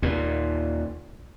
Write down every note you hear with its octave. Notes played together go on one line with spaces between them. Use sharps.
D#2 A#2